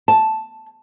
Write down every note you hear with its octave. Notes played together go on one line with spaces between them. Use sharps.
A5